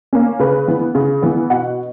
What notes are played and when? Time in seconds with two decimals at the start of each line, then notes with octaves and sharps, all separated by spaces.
0.13 A#3 C#4
0.39 C#3 B4
0.68 E3 B3
0.95 C#3
1.22 E3 B3
1.50 B2 F#5